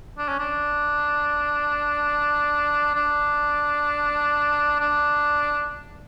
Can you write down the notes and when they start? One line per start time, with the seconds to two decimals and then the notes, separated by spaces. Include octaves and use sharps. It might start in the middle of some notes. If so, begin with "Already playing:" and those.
0.18 D4
0.29 C#4
0.39 D4
2.95 D4
4.80 D4